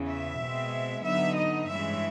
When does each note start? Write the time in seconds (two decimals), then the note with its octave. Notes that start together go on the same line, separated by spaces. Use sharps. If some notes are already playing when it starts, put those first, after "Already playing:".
Already playing: E2 C#3 E3
0.09 E5
0.41 B2 G#3 C4
1.05 D3 F#3 B3 D#4 E5
1.38 D#5
1.69 G2 E3 G#3 C#4 E5